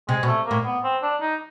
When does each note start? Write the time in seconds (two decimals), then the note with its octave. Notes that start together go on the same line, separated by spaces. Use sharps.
0.09 C3 G#3
0.23 B2
0.27 A3
0.46 A2 A#3
0.65 B3
0.84 C4
1.03 D4
1.22 D#4